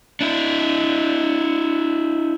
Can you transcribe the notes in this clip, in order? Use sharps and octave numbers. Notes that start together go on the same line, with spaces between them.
D4 E4